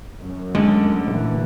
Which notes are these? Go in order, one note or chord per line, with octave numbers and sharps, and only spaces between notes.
F#2
D2 D3 G#3
D1 A#2 E3